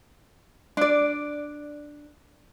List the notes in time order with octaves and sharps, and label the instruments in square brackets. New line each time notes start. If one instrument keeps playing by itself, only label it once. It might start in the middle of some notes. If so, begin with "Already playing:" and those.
[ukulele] D4 D5